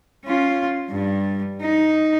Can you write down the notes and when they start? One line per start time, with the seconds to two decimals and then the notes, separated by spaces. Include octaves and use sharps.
0.25 C#4 F4
0.89 G2 G3
1.61 D#4